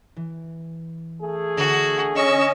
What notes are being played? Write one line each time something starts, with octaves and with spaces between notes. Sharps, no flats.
E3
A3 G#4
D3 F#4
C#4 C#5 D#5 C#6 E6